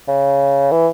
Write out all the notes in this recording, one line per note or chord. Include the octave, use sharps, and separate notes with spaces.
C#3
E3